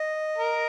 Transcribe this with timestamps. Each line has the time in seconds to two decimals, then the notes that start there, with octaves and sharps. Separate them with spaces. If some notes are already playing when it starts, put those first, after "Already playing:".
Already playing: D#5
0.38 A#4